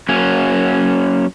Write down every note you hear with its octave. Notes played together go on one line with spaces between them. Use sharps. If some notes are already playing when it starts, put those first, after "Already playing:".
F#3 A#3 C#4